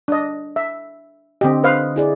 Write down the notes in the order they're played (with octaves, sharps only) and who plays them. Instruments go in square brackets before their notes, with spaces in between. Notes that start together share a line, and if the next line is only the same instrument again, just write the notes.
[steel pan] D4 D#5
E5
[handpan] D3 D#5 [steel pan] C4 G4
[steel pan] B4 C5 F5
[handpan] E4 G#4 D5